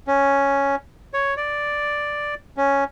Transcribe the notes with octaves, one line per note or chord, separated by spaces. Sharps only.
C#4
C#5
D5
C#4